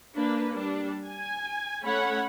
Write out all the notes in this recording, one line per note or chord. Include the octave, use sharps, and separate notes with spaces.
A#3 D4 B4
G3 D4
G#5
A3 C#4 C#5 F#5 B5